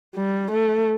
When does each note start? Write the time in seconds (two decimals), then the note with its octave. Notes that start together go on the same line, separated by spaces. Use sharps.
0.16 G3
0.51 A3